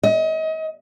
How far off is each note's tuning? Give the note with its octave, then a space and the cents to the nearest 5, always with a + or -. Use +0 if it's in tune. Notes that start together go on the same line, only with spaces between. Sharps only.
D#5 +35